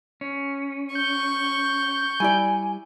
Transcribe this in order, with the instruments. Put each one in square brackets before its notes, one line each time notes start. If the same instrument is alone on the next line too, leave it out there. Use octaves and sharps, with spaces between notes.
[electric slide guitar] C#4
[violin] C#6 [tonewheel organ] G6
[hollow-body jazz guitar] G3 E4 D5 [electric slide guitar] G#5